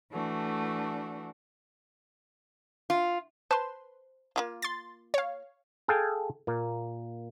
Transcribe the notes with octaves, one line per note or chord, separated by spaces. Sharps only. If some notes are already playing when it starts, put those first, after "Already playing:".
E3 A3 D4 F#4
F4
B4 C5 A5 C6
A#3 E4 F4
C6 A6
C#5 F5
G#4 A4 F5 G5 G#5
A#2 A#3